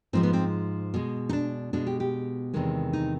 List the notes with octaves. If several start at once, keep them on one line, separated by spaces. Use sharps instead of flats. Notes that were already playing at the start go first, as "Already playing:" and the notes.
G#2 F3 G#3 C4
B3
C4
B2 G#3
D#4
D4
B2 G#3 D4
G4
G4
E2 C3 D#3 G#3
D#4